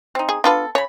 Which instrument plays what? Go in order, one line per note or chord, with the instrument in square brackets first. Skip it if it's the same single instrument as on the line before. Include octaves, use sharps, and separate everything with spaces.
[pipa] C4 D#4
[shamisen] G#4
[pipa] B3 A4 [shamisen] D4 F4 B4
[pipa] C#3 B5 [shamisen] C#5